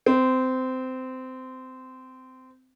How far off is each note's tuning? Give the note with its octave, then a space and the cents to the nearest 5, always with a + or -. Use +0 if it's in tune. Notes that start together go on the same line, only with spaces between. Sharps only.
C4 -20